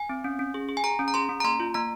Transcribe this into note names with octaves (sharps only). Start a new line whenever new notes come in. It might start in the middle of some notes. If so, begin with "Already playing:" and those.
Already playing: G#5
C4
C#4
C#4
G#4
G#4
G#5
G#4 A#5
C#4
A#5
G#4 C6
C#4
A#5
A#3 C6
F4
A#3 A#5